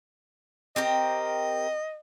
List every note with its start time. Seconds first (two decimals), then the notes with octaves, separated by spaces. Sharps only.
0.76 C4 G4 A#4 D#5